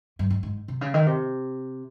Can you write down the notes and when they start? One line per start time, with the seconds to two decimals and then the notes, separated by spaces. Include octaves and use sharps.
0.19 G2
0.30 G#2
0.43 G#2
0.68 C3
0.81 C#3
0.94 D#3
1.06 C3